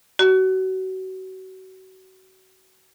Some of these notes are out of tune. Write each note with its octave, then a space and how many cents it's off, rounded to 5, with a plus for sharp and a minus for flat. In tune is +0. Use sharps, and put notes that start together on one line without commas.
F#4 +30